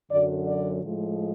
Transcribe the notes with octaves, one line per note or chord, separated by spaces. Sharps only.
F#2 D3 F#3 D5
D5
A2 F3 G#3